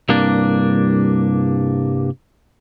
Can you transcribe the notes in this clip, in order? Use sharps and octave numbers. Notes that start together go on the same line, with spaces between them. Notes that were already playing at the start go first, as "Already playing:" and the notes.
C2 G2 A#3 D4